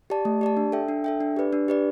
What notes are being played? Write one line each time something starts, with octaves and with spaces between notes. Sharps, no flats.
G4 D5 A5
A3
G4 D5 A5
D4
A4 E5 G5
D4
A4 E5 G5
D4
G4 B4 D5
D4
G4 B4 D5